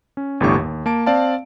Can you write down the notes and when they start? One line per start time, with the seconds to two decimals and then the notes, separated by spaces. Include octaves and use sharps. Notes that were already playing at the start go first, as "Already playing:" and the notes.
0.17 C#4
0.40 G1 E2 A2 D4 G4 C#6
0.55 D#2
0.86 A#3 A5 D7
1.06 C4 D5 F5 A5